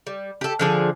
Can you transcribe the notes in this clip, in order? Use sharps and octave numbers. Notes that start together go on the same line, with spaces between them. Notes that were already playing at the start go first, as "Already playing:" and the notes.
G3
G4 A4
D3 F3 G#4